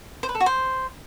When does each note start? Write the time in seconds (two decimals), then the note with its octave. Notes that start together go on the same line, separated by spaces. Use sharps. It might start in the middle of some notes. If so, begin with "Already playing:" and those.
0.23 C5
0.29 B4
0.35 A4
0.40 F#4
0.46 C5